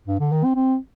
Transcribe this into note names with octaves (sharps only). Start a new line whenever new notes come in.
G2
D3
D#3
C4
C4